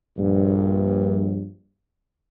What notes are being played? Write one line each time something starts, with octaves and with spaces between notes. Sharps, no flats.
A#1 G2